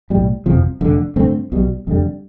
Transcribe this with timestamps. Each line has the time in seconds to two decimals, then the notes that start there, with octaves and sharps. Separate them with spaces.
0.10 B1 A2 G3
0.46 G1 F2 C3 F3
0.81 F1 F2 D3
1.16 G2 D3 A3 C4
1.52 B1 B2 G3
1.87 F1 F2 D3 G3